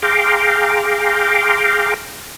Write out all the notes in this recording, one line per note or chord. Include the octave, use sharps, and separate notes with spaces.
G#4 F5 G5 A#5 C6 D6